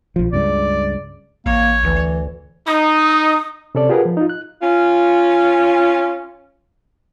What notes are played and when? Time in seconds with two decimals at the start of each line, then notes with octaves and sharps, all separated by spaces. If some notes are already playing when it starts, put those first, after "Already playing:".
0.16 A#1 F3
0.33 C#2 G2 C#3 D5
1.46 A1 A#3 C#5
1.84 D2 E3
2.67 D#4 D#6
3.75 C3 C#4 A4 D5
3.89 F4 G4 G#4 A#4 B4 F#5
4.05 F3
4.17 D#4 F4
4.30 F#6
4.62 C#4 F4